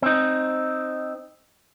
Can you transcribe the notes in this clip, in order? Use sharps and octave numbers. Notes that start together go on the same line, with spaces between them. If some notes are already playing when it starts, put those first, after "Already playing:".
C4 D#4